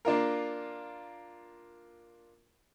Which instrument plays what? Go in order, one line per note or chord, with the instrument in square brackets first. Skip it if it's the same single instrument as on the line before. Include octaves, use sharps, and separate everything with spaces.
[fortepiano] A#3 D4 F4 A#4